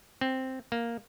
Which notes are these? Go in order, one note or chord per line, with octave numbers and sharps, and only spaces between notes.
C4
A#3